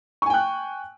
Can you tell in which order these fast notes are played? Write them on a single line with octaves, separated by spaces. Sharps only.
C#6 G#5 G5 F#6